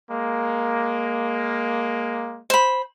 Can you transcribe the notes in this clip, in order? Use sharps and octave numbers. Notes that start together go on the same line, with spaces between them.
G#3 A#3
C5 B5